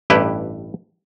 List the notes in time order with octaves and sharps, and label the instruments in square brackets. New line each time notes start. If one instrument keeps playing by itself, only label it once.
[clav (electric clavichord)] A1 G2 E4 G4 B4